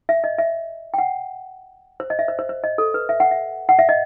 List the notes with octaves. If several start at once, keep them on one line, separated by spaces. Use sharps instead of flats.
E5
D#5
E5
G5
F#5
C5
D#5
E5
C5
C5
C5
D#5
A4
B4
E5
F#5
E5
F#5
E5
D#5